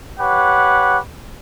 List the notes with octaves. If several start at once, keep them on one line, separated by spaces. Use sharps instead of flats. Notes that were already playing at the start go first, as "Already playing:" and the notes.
G4 B4 C#5 F#5